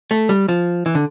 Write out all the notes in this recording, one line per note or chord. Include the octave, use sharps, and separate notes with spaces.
A3
G3
F3
E3
D3